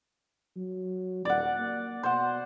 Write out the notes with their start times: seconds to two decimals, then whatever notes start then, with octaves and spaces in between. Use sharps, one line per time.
0.57 F#3
1.25 D#1 D5 F#5
1.57 A#3
2.03 B2 C5 F#5